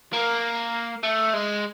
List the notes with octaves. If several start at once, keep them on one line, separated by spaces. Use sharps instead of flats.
A#3
A3
G#3